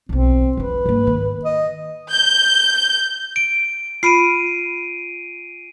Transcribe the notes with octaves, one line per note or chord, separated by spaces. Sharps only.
B1 E3 C4
F2 F3 B4
G#2 A#3
D#3
D#5
G6
D7
F4 B5 C7 D7 D#7